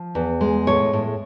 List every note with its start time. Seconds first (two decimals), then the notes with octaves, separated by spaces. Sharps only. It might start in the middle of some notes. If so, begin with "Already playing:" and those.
Already playing: F3
0.15 E2
0.41 G#3
0.67 A2 C#5
0.93 A2